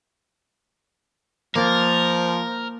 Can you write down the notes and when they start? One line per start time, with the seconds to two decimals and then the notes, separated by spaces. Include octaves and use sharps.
1.55 F3 A#3 A#4 A6